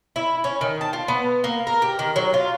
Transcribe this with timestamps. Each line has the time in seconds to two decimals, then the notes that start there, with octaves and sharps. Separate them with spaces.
0.16 E4
0.44 C#4
0.61 D#3
0.81 A5
0.93 F4
1.08 B3
1.44 A#3
1.67 A#4
1.82 G4
1.99 D#3
2.16 F#3
2.34 F4